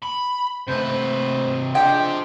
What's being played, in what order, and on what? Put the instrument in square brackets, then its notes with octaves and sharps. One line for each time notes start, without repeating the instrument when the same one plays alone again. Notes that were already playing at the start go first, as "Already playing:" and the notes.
[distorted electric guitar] B5
[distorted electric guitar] C3 B4 [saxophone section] A3 C5
[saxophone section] F3 G#3 D4 [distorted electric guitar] G4 C5 [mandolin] G5